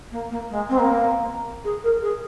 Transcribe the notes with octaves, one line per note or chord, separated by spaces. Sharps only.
A#3
A#3
G#3
C4
A#3
G#4
A#4
G#4